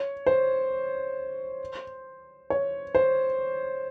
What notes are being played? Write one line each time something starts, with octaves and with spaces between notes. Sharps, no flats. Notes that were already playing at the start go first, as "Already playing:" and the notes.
Already playing: C#5
C5
C#5
C5